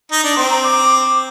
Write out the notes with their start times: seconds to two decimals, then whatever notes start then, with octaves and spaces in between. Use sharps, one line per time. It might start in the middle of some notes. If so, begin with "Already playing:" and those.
0.12 D#4
0.24 D4
0.36 C4 C6
0.50 A#5
0.64 D6